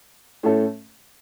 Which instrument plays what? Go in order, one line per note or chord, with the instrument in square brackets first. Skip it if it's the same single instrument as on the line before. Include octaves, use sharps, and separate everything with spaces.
[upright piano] A2 A3 C#4 A4